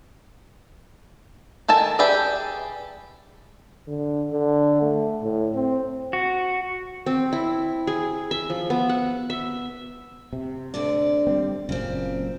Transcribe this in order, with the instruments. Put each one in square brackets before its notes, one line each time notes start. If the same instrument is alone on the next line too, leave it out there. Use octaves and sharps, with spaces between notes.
[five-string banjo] D#3 A4 G#5 A5
G4 G#4 B4 D5 E5
[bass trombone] D3
D3
A3
A2
C4
[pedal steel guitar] F#4
[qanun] C4
E4
G#4
E5
F3
B3
F#5
E5
[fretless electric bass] C3
[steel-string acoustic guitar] D2 D3 D5
[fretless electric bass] G3 G#3 C4
[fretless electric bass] F#1 F#2 A#2 [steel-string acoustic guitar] C#3 C4